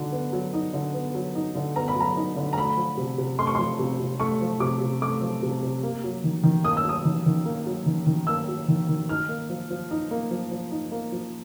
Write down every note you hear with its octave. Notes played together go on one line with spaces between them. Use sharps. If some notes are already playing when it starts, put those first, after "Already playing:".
Already playing: D3 F#3 D#4
B3
F#3
D#4
D3
B3
F#3
D#4
D3
B3 A#5
B5
F#3 A#5
D#4
D3
A#5
A3 B5
F3
C3
C3
A3 C6
C#6
F3 C6
C3
C3
A3 C#6
F3
C3 D6
C3
A3 D6
F3
C3
C3
A#3
F#3
D#3
D#3
A#3 D#6
E6
F#3 D#6
D#3
D#3
A#3
F#3
D#3
D#3
A#3 E6
F#3
D#3
D#3
D#4 F6
A#3
F3
F3
D#4
A#3
F3
F3
D#4
A#3
F3